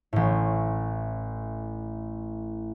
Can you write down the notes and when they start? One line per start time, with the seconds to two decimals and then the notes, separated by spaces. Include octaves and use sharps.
0.13 A1 A2